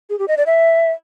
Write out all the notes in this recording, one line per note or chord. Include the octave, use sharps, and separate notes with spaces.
G#4
G4
D#5
D5
E5